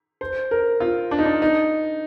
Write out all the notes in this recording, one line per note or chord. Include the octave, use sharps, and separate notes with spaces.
C5
A#4
F4
D4
D#4
D4
D#4